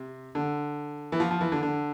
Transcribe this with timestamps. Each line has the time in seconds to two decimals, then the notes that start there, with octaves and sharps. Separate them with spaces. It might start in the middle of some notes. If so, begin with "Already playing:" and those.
Already playing: C3
0.35 D3
1.12 E3
1.20 F3
1.31 F3
1.41 E3
1.52 D3
1.62 D3